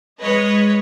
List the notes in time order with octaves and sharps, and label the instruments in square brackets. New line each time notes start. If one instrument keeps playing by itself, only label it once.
[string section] G#3 B4 C#5 D#5